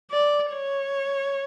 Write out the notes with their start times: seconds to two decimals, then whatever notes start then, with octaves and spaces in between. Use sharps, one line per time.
0.11 D5
0.52 C#5